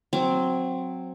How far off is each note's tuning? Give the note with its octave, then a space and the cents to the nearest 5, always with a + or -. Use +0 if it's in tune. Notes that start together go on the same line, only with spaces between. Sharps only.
F#3 -10 C4 +0